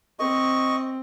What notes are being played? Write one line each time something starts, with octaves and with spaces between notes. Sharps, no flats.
C4 D#5 C#6